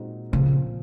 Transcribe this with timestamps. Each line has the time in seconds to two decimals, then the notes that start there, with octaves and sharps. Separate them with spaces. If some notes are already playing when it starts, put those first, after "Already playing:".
Already playing: A#2 G#3 C4 D#4 F#4
0.32 A#2 C#3 F3 C4